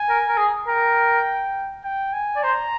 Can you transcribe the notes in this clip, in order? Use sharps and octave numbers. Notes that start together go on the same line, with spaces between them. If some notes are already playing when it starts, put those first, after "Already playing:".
Already playing: G#5
A#4
A#4
G#4
A#4 G5
G5
G#5
D5
C5 A#5